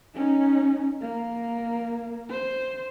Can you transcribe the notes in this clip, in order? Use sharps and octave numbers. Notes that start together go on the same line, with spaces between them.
C#4 D#4
A#3
C5